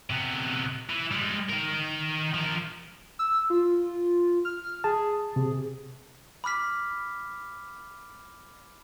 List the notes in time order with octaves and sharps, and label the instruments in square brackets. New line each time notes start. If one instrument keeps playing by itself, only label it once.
[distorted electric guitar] C3 B3
E3
G3 G#3
D#3 A#4
F3 A#4
[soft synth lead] E6
F4
F6
[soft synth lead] G#4 [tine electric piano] A5
[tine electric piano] C3
[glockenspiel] B5 D6 F6 B6